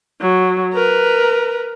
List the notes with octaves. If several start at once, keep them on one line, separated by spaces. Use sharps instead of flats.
F#3
A#4 B4